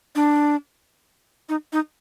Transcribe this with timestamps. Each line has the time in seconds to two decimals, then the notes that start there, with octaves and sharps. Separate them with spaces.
0.15 D4
1.49 D#4
1.73 D#4